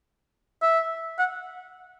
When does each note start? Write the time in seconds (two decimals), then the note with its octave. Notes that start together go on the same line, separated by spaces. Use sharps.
0.62 E5
1.19 F#5